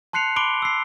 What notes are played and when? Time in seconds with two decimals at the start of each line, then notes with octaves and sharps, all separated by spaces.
0.13 A5 C6 F#6 C7 C#7 F7
0.36 B5 C6 D6 D7 G7
0.62 E6 C7